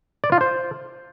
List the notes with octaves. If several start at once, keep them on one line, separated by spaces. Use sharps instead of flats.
D5
F4
C5